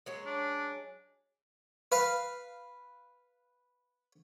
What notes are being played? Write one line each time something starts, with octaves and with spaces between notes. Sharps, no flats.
F#3 G#3 C#4
D4
B4 F5